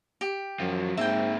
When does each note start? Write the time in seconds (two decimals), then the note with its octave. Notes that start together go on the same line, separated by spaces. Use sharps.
0.21 G4
0.60 F#2 F3 F#3
0.97 G#2 A#3 C4 E5 G5